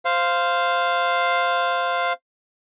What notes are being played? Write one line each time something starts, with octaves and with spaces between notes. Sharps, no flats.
C5 F5